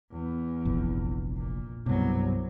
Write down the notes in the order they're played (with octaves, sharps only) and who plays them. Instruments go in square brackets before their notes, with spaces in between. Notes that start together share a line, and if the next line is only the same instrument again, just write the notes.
[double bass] E2
[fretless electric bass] F1 A#1 F2
[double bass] A#2
[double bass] C2 F#3 [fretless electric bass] G2 B2